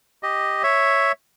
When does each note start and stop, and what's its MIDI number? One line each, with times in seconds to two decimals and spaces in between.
0.23 0.63 67
0.23 0.63 75
0.63 1.12 73
0.63 1.12 76